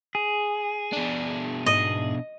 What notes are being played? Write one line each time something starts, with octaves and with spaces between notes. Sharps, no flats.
G#4
B2 D4
G#2 D#5